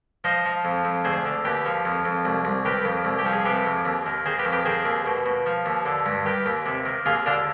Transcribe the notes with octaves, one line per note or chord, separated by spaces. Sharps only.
F3 C5 D#5
F3
F2
F2
D2 G#4 C5
D3
D#2 G4 B4
F3
F2
F2
C2
C2
D#3 G4 B4
F2
C2
G4
F3
G#4
C3 G4 B4
F2
D#2
D#3
D#3 G#4 C5
G4 B4
F2
G4 B4
D#3 G#4 C5
D#2
B2
B2
F3
D#2
D3
G2
D#3 G4 B4
D#2
C3
D#3
D#2 F4 G#4
D3 D4 F4